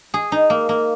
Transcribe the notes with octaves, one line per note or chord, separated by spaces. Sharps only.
G#4
D#4
A#3
A#3